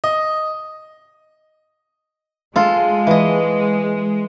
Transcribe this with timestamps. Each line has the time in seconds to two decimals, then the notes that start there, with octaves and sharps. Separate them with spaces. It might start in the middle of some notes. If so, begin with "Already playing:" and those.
0.04 D#5
2.56 G#3 F4 A4
3.07 E3 D#5